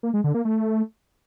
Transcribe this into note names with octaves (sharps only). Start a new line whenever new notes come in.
A#3
G#3
D3
A#3
A3